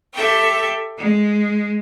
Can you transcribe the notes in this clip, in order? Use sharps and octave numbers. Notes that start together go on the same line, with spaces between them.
G4 A4 E5 G5
G#3